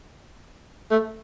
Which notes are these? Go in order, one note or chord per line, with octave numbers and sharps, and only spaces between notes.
A3